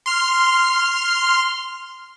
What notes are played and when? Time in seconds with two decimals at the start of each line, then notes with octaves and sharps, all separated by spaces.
0.06 C6 F6